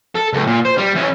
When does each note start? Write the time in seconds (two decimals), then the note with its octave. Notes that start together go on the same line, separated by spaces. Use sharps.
0.15 A4
0.33 C#2 A2
0.47 A#2
0.65 C5
0.78 G3
0.95 E3 C#4